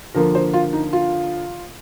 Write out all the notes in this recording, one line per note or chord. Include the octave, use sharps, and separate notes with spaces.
D3 F3 A#3 A#4
C5
F4
D#4
F4